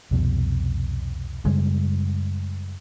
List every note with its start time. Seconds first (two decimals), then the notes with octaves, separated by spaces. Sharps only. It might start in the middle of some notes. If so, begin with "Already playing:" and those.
0.11 C2 F2 B2
1.45 F#2 C#3 G3 G#3